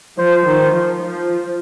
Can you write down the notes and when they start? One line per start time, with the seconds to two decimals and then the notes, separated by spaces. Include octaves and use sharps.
0.18 F3 C5
0.46 D#3
0.74 F3
1.02 F3